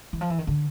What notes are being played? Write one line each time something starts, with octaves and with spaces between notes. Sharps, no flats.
E3
F3
E3
D#3
D3